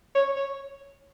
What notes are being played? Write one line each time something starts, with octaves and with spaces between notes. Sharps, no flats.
C#5
C#5